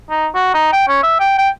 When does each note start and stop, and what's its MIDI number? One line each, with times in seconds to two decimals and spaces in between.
0.10 0.27 63
0.35 0.51 66
0.54 0.71 63
0.72 0.87 79
0.88 1.01 61
1.03 1.20 76
1.20 1.34 79
1.38 1.49 79